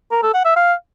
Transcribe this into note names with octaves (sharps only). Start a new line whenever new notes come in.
A#4
A4
F#5
E5
F5